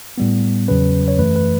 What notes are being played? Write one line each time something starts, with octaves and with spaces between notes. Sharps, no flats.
A2 G3 B3
E2 C#3 F#3 C#4 B4
C#5
F#2 E3 A3 B4
B4